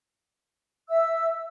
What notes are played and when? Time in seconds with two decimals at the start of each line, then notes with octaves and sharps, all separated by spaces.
0.89 E5 E6